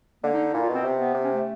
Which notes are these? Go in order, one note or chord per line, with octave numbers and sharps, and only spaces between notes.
D3 A#3
D#4
D#4
A#2 E4
F4
B2
C4
C3
B3
C3
C#4
A3